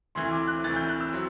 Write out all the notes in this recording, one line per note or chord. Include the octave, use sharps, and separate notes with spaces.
D2 C3 E3 C6
D6
F#6
D2 C3 E3 A6
G6
F#6
E6
F#3 C4